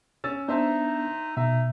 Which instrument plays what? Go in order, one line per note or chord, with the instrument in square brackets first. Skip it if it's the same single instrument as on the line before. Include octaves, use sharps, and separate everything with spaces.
[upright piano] C#4 E6 A6
[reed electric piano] B3 D4 [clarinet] D#4 [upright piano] C5 E5 A5
[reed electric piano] B2 [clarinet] D#4 [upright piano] E5